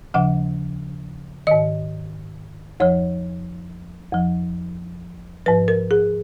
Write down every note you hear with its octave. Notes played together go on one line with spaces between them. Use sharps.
D#2 C#3 F3 F#5
G#2 D#3 D#5
F2 F3 C#5
F2 F3
G#2 F3 B4
A#4
G#4